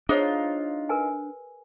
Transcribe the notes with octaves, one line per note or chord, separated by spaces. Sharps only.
D4 D#4 F4 G#4 C5 C#5
A#4 B4 G#5